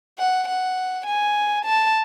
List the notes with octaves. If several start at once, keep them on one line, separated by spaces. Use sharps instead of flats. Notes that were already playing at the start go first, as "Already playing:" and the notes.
F#5
F#5
G#5
A5